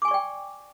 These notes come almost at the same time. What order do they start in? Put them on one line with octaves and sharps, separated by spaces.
D6 G#5 C#6 D5 G5